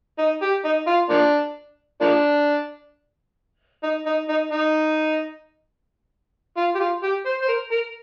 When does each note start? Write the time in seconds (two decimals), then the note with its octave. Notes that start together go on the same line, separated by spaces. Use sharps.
0.18 D#4
0.42 G4
0.64 D#4
0.87 F4
1.10 F3 A#3 D4
2.01 F3 A#3 D4
3.83 D#4
4.06 D#4
4.29 D#4
4.51 D#4
6.57 F4
6.75 G4
6.80 F4
7.03 G4
7.25 C5
7.41 C5
7.48 A#4
7.71 A#4